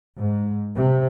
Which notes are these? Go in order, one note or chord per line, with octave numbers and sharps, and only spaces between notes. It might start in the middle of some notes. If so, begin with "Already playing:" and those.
G#2
C3